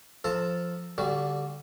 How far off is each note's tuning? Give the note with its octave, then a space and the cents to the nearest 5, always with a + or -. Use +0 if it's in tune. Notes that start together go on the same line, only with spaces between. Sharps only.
F3 +0 A4 +0 A#5 -35
D3 -20 G3 +0 F#4 +0